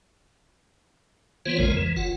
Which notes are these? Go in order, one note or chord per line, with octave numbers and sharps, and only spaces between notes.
E3 A#3 B3 F4 C5 C#5
A#1 F2 C#3 G#3 A#4
E3
F#1 F4 F#5